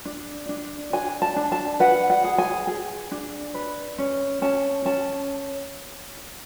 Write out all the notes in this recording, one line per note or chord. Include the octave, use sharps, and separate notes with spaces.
D4
D4
D4 G#5
A5
D4
A5
B4 F#5
F#5
G#4
G#5
G#4
D4
B4
C#4
C#4 A5
C#4 A5